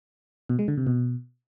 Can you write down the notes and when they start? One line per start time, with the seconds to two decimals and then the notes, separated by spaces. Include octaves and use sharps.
0.49 B2
0.59 G#3
0.68 D3
0.77 C3
0.87 B2